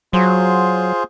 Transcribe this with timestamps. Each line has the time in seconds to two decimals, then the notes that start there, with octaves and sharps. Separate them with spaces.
0.13 F#3 F4 G#4 C5